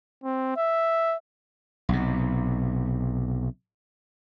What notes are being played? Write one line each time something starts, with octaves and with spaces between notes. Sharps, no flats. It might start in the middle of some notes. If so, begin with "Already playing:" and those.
C4
E5
B1 C3